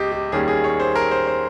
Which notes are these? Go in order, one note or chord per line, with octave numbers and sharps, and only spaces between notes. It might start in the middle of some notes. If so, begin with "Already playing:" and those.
Already playing: C#2 G4 D#5
G4
D#2 D#3 G3 C#4 G#4
G#4
C#5
C5
A#4
C5
C5